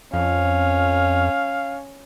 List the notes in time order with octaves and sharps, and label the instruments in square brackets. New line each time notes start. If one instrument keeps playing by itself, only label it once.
[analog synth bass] F2 [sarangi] C#4 [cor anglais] F5